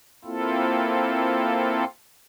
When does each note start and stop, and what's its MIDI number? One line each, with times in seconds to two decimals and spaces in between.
0.25 1.84 58
0.25 1.84 60
0.25 1.84 64
0.25 1.84 65
0.25 1.84 69